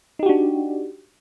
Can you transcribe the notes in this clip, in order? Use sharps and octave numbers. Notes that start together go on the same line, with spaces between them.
D4 D#4 F#4 G4